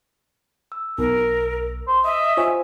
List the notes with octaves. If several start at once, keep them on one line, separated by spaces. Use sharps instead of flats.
E6
B1 A#4
C5
D#5 E5
F4 C5 C#5 G#5